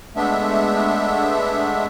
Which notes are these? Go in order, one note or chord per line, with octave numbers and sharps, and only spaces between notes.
G#3 A3 B3 D4 E5